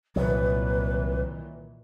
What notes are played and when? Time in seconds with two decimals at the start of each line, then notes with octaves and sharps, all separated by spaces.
0.16 C2 A#2 D#3 E3 F#3 B4